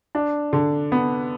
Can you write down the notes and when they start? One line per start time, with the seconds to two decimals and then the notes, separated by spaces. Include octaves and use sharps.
0.15 D4
0.53 D3
0.92 B3